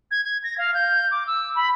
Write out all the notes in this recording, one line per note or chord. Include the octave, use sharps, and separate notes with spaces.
G#6
G#6
A#6
F5
G6
D6
E6
B5